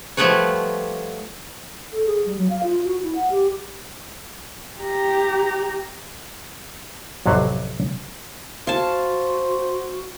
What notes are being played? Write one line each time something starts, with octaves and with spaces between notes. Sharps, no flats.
F3 G3 A3 B3 B4 C#5
A4
G#4
G3
F#3
F5
F4
F#4
E4
F#5
G4
G4 A#5
A1 F2 C3 F#3 F5 F#5
F#4 C5 F5 A5